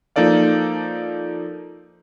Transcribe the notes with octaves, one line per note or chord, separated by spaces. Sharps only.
F3 A#3 D#4 A4 D5 F5